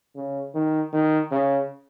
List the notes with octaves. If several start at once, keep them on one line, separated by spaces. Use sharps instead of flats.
C#3
D#3
D#3
C#3